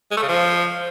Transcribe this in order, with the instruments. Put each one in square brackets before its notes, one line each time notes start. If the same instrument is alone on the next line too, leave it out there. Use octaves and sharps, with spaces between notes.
[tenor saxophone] G#3
A3
C#3
F3